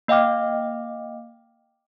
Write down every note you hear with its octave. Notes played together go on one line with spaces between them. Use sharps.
A#3 D#5 F5 G5 D6 F6